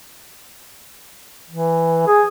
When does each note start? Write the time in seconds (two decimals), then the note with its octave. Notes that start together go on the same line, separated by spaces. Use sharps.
1.50 E3
2.07 G#4